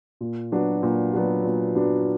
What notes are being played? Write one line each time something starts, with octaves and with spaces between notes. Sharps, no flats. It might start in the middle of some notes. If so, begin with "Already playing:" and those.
A#2
F#3 B3 D4 F#4
A#2
F#3 B3 D4 F#4
A#2
F#3 B3 D4 F#4